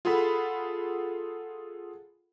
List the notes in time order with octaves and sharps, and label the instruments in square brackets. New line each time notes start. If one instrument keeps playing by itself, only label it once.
[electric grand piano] F4 G#4 A4 F#5 B5